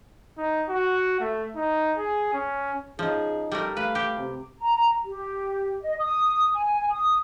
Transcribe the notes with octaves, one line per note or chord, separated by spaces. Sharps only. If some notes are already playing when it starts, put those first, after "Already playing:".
D#4
F#4
A3
D#4
G#4
C#4
F3 C#4 D#4 G#4
G3 A3 A#4
A3 B4 F5
G4
C3
A#5
G4
D#5
D#6
G#5
D#6